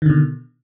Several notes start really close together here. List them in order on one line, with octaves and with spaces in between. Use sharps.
D#3 D3 B2